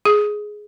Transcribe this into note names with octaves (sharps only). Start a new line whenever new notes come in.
G#4